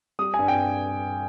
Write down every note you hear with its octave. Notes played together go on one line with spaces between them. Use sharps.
G3 D#6
G2 G#5
G5